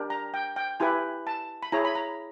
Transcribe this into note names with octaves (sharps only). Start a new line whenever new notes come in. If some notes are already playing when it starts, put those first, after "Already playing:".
Already playing: D4 G4 A#4
A#5
G5
G5
E4 G4 B4 G#5
A5
B5
E4 G#4 C#5 A#5
B5
A#5